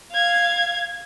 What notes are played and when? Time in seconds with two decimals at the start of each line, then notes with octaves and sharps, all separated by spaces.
0.13 F5 G#6